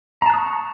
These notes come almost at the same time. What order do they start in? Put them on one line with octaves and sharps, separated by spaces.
A#5 A5 F#6 D#6 C#6